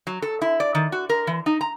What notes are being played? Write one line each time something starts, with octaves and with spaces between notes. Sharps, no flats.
F#3
A4
E4
D5
D#3
F#4
A#4
E3
D#4
A#5